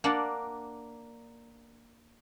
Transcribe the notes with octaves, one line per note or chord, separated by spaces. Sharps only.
A#3 D4 F#5 A5